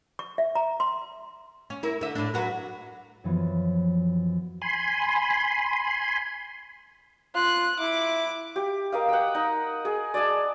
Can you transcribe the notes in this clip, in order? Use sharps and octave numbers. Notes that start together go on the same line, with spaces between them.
C#6
E5
A#5
C6
C#4
E4 A#4
D3 E5
A2 D4
F#3 F#4 B4
F#2 E3 F3 B3
G#5 B5 C6
F4 F#6
E4 D6
G4
A#4 D#5 F5
F#5 G5
D#4
G#4
D5 D#5 G#5 A5